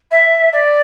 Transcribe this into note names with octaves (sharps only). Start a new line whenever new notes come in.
E5
D5